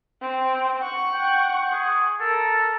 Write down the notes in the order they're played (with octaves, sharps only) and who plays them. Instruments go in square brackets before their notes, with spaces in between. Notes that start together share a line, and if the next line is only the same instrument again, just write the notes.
[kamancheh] C4
F#5 C#6
[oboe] G5
G#4
[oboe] A4 [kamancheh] A#4